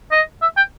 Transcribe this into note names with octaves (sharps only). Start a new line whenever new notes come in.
D#5
E5
G5